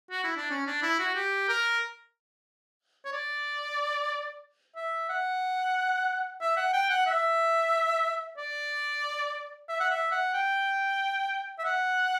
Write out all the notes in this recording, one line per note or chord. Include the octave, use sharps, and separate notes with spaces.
F#4
E4
D4
C#4
D4
E4
F#4
G4
A#4
C#5
D5
E5
F#5
E5
F#5
G5
F#5
E5
D5
E5
F#5
E5
F#5
G5
E5
F#5